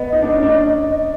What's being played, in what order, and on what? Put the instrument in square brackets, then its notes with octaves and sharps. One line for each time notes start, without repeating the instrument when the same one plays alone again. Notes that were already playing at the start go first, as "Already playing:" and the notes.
Already playing: [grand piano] B3 [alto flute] D#5
[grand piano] D#4
D4
C#4
D4